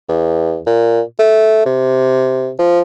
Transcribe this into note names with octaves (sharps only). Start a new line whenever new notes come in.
E2
A#2
A3
C3
F3